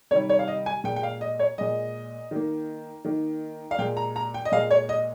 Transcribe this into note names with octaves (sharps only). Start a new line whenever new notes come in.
C3 D#3 G3 C#5
C#5
F5
D#5
G#5
A#2 G#3 G5
G5
F5
D#5
C#5
A#2 G#3 D#5
D#3 A#3
D#3 A#3
F5
A#2 G#3 G5
A#5
A#5
G5
D#5
A#2 G#3 F5
C#5
D#5